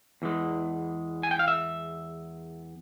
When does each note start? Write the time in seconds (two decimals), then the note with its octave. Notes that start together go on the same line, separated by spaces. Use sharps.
0.22 E2 E3 G#3
1.23 G#5
1.31 G5
1.39 F5
1.48 E5